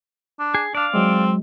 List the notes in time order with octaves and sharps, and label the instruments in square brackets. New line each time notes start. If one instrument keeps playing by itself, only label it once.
[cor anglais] D4
[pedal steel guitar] G#4
[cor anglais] D4 [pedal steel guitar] D5 F5
[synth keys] F#3 G#3 [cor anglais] C4